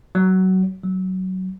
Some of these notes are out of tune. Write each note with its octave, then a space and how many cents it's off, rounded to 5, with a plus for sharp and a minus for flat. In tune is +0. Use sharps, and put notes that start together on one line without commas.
F#3 +20
F#3 +15